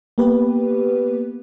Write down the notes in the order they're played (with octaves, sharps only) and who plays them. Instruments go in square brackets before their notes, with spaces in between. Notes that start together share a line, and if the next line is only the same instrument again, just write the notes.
[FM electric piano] A#3 B3 G4 B4